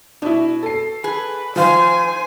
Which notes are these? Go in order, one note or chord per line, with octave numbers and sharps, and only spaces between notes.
B2 D4 E4
A4 C7
G#4 B4
D#3 F3 C5 F5 G#5